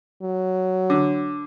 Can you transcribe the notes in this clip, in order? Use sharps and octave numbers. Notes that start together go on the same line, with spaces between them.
F#3
D3